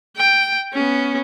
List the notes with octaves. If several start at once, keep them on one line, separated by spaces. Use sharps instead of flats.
G5
B3 C#4